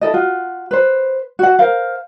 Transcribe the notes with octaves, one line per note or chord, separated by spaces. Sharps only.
E4 A4 D#5
F4 F#4
B4 C5
F#4 F#5
A#4 C5 F5